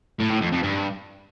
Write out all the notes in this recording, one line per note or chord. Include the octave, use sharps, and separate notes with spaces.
A2
A2
F2
F2
G2